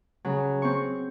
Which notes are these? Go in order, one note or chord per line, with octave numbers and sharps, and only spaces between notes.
C#3 F#3
C4 C#6